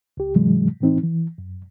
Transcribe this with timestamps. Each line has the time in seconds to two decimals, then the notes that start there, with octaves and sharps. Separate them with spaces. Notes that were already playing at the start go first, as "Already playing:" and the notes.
0.17 C#2 G4
0.35 G#2 C3 E3 F#3 G#3
0.81 A2 E3 C4 D#4
1.04 E3
1.38 F#2